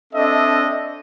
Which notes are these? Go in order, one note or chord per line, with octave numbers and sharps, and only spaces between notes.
C4 D4 A4 D#5 E5